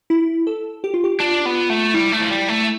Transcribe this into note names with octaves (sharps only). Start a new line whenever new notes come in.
E4
A4
G4
F4
G4
D4 F4
B3
A3
G3 E4
A3
F3
G3
A3